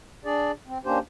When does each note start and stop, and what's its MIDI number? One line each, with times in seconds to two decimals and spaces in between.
0.25 0.52 62
0.25 0.52 68
0.25 0.52 74
0.67 0.78 60
0.85 0.99 58
0.85 0.99 61
0.85 0.99 62
0.85 0.99 67
0.85 0.99 72